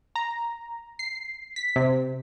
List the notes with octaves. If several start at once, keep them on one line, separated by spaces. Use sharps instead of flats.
A#5
C7
B6
C3